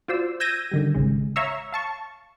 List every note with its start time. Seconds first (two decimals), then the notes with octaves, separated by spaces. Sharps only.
0.08 F4 F#4 C5 D5 E6
0.40 E6 G6 G#6 A#6 D#7
0.71 D3 D#3 G3
0.95 A1 C#3 G#3
1.36 C#5 E5 F5 A#5 C#6 E6
1.72 F5 A5 C#6